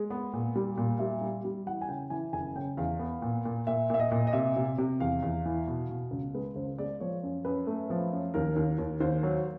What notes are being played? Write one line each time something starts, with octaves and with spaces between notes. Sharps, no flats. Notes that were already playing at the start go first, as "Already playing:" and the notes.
Already playing: G#3
B3
A#2
G3
A#2
G3 E5
G3
G3
E3 F#5
G#5
C#3 G5
E3 G#5
F#1 G#5
C#3 G5
E2 F5
B3
A#2
A#2
A#2 E5
A#2 E5
D#5
A#2
D#5
C3 E5
C3
C3
E2 F5
E2
E3
B2
B2
C#2
G#3 B4
C#2 C5
G#3 D5
F3 C#5
F#2
F#2 B4
A3
F3
F#2
D#2 A#4
D#2
D#2
D#2 C5
F#3